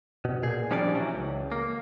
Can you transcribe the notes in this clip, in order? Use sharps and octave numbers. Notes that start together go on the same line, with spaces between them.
B2
A#2 G#4
D#3 F3 G3 C#4 D4 D5
E3 F#3
C#2
A#3